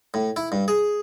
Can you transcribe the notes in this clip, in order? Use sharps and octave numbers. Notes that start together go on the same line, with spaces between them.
A2
E4
G2
G#4